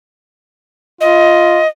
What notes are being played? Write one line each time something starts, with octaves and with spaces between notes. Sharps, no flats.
F4 D#5